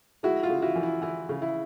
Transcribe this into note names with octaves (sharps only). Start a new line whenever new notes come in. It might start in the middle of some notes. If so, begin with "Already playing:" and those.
G#3 E4 F#4
F4
C#3
E4 F#4
E3
E4
E3 E4
C#3
E4